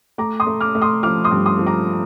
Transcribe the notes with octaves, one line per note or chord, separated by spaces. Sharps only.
A3 A#5 D6
C6 D#6
A3
D6 F6
A3
C6 D#6
F3 D6 F6
C6 D#6
G2
C6 D#6
F3
A#5 D6